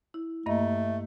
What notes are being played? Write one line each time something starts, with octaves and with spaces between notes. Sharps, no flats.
E4
G2 A3 A#3 D#5